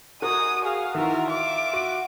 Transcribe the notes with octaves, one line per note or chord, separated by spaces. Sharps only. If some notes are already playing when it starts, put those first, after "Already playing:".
D#4 F#4 G#4 A#4 G#5 D#6
G#4 F5
D#3 E3 F4 A#4 E5
D6
F#4 D#7